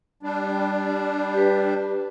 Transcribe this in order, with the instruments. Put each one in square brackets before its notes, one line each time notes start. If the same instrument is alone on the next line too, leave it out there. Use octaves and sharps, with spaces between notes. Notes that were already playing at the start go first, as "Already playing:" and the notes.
[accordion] G3 D4
[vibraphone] G4 B4